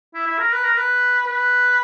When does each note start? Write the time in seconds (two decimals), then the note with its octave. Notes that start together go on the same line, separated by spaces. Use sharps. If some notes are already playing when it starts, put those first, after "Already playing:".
0.14 E4
0.26 E4
0.39 A#4
0.52 B4
0.64 A#4
0.77 B4
1.26 B4